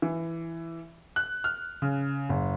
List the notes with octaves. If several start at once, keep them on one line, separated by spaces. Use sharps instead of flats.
E3
F#6
F6
C#3
F#1